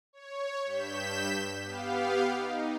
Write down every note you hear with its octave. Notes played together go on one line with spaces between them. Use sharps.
C#5
G2 G6 B6 E7
B3 G4 F5
D#4